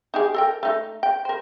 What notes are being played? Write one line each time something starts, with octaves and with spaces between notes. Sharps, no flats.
D#4 G4 G#4
A4 A#4 G5
A3 D#4
G5
A#4 C5